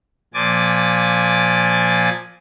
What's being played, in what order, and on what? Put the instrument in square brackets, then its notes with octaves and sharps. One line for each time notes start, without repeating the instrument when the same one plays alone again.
[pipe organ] A#2 F3 G#5 D6 A6